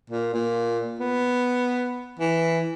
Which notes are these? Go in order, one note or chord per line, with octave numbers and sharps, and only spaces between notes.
A#2
A#2
B3
E3